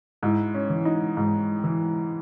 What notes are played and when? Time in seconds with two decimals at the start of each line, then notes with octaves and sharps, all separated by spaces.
0.23 G#2 E4
0.54 C#4
0.70 E3
0.85 D#4
1.17 G#2
1.64 E3